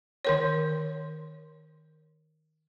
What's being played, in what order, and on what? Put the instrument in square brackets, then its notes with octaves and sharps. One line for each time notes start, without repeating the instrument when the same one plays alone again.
[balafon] D#3 A#4 C#5